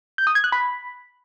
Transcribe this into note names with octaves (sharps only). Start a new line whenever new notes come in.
G6
D#6
G#6
F#6
B5